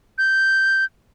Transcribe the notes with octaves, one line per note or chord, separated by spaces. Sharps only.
G6